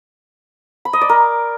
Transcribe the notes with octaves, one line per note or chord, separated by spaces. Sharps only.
B5
D#5
D5
A#4